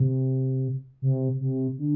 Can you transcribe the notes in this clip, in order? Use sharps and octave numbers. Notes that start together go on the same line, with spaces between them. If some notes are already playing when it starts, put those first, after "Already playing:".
Already playing: C3
C3
C3
D3